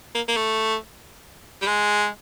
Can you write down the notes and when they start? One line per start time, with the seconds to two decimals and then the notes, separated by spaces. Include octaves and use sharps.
0.15 A#3
0.28 A#3
0.37 A3
1.62 G3
1.67 G#3